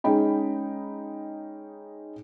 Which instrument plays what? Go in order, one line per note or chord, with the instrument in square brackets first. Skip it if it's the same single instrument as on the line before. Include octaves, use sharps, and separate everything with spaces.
[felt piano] G#3 C#4 D#4 G5 B5